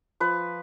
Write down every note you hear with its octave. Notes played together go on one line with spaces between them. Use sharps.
F3 B4